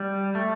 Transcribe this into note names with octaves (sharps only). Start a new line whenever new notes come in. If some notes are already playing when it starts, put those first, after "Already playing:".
Already playing: G3
A3